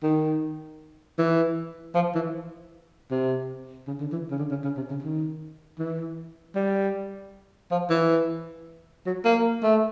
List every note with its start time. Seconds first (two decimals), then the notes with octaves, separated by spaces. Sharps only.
0.03 D#3
1.18 E3
1.94 F3
2.15 E3
3.11 C3
3.87 C#3
4.00 D3
4.12 E3
4.30 C#3
4.38 D3
4.50 C#3
4.64 C#3
4.77 C3
4.90 C#3
5.02 D#3
5.79 E3
6.55 G3
7.71 F3
7.90 E3
9.06 F#3
9.25 A#3
9.63 A3